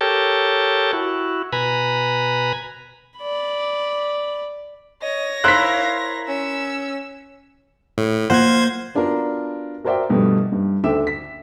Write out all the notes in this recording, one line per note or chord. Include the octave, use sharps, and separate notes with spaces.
G4 A4 A#4 C#5 G5 A5
E4 F#4
B2 B4 G#5 A#5 B5
D5 B5
C#5 D#5 A#6
E4 A#4 C5 F5 F#6 B6
C#4 E6
A2
A#3 F4 C5 F#5 G#6
B3 D4 F4 F#4 A#4
F#4 A#4 C5 D5 E5 G5
G2 B2 F3 G3 A3
G2
D2 D3 E5 G5 D6 E7
B6